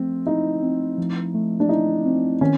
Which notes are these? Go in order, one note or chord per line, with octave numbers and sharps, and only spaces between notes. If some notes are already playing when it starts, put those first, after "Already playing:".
Already playing: F3 A3 C4
D#4 E4
C4
F3
A3
D4
D#4 E4
C4
D#3 C#4